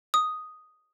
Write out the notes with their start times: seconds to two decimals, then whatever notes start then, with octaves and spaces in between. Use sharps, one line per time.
0.14 D#6